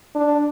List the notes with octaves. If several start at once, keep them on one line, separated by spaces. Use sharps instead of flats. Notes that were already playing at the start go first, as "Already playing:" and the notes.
D4